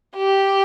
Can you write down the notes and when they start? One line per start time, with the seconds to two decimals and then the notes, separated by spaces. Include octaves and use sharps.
0.16 G4